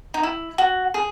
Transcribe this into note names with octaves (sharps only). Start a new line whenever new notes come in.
D#4
E4
F#4
G#4